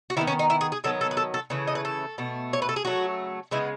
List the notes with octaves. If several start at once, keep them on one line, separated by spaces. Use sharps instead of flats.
F#4
D#3 G#3 B3 E4
C#4
D#4
E4
G#4
G#4
D#3 F#3 B3 A4
A4
B4
A4
A4
C#3 E3 A3
D#5
B4
A4
B2 A3
C#5
B4
A4
G#4
C#3 F#3 A3 F#4
C#3 G#3 B3 E4